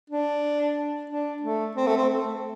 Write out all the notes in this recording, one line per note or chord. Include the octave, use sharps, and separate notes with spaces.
D4
D4
A3
C4
A3
C4
A3